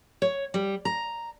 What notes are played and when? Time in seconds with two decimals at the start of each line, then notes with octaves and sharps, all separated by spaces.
0.22 C#5
0.54 G3
0.85 A#5